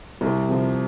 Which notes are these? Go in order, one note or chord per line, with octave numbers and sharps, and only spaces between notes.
C2
C3 F3